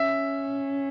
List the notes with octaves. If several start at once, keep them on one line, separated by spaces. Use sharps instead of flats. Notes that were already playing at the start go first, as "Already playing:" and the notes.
Already playing: C#4 E5